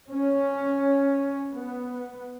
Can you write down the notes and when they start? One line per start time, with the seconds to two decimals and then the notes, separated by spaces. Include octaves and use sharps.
0.10 C#4
1.51 B3